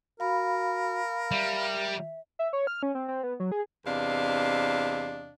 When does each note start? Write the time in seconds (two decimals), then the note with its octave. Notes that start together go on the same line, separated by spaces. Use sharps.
0.20 F#4 A#4 F5 B5
1.31 G3 E5
2.39 E5
2.53 C#5
2.67 F6
2.83 C#4
2.95 C4
3.08 C4
3.23 B3
3.40 F#3
3.52 G#4
3.85 E2 C3 D4 D#5 F5